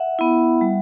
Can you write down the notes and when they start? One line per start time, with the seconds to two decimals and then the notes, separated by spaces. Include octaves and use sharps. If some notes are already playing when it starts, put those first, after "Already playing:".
Already playing: E5 F#5
0.19 B3 E4
0.61 G3